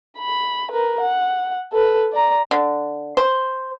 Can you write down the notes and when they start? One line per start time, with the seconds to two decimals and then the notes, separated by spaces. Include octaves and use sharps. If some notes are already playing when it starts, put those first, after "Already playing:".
0.18 B5
0.71 A#4 B4
1.00 F#5
1.72 A4 B4
2.13 D5 A#5
2.51 D3
3.17 C5